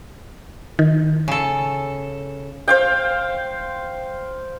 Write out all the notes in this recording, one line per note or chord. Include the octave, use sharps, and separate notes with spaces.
D#3
C#3 A4
C5 F5 G5